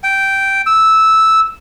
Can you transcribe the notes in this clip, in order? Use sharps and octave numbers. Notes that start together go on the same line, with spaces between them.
G5
E6